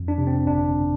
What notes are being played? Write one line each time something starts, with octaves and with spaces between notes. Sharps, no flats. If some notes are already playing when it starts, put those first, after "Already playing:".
Already playing: F2
D4
C3
C4
G1 D4